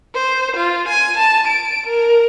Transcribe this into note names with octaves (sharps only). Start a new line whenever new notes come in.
C5
F4
G#5
A5
D7
A#4